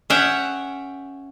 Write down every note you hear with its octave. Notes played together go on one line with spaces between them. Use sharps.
C#4 G#4 C#5 E5 F#5 G5